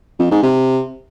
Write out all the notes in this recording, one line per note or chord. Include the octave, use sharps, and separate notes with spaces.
F2
G#2
C3